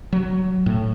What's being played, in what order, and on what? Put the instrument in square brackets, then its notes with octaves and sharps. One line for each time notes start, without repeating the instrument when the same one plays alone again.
[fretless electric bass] F#3
A2